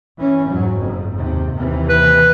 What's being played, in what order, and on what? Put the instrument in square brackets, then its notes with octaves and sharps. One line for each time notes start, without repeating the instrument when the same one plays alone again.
[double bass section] E3 C#4
F2 G#2 F#3
F#1 F2 G#2
D#2 C3
D#2 C3 E3
[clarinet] B4